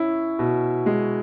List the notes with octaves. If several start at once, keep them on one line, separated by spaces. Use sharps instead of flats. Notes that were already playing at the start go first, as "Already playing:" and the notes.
Already playing: C#4 E4
B2
G#3